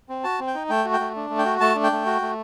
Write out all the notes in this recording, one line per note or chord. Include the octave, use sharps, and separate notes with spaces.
C4
F#4 A5
C4
G5
D#4
A3 G5
F#4
G5
A3
D4
A3
G5
F#4
A3 A5
D4
G5
A3
F#4
A3